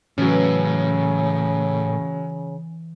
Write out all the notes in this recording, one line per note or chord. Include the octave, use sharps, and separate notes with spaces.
A2 C#3 E3 F#3 C#4